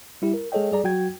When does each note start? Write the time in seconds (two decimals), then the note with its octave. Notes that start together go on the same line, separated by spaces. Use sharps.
0.22 G3 E4 G4
0.34 A#4
0.52 G#3 G#4 A4 C#5 D#5 G5
0.71 G3 G#4 D5 A#5
0.84 F#3 F#4 G5 G#6